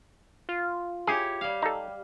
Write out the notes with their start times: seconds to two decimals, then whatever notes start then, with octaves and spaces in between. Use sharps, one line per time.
0.49 F4
1.07 E4 G4 G#4 C#5
1.41 G3 F5
1.62 D#4 A4